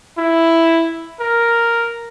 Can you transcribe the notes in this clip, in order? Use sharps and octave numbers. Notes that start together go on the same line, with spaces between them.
E4
A#4